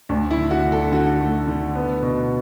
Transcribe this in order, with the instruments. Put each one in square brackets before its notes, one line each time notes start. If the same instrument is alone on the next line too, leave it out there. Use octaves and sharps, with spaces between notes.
[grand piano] D2 [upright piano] D4
[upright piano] E4
[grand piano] D3
[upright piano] F#4
[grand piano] D3
[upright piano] A4
[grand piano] D3 [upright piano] F#4
[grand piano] A3
D3
B3
B2